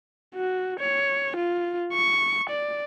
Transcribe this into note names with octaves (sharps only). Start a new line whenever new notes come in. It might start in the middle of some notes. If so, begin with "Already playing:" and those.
F#4
C#5
F4
C#6
D5